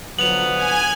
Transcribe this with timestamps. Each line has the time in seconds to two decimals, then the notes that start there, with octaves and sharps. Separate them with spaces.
0.19 D3 F3 F#3 B3 F7 F#7
0.55 G#5